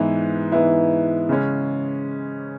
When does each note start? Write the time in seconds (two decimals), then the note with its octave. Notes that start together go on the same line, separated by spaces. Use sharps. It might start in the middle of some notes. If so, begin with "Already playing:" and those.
Already playing: G#2 E3 B3 E4
0.52 G#2 E3 B3 E4
1.29 C#3 G#3 C#4